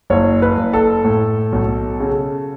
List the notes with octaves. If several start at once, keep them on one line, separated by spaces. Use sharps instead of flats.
F#1 C#5
B4
F#1
A4
A2
B1
C#3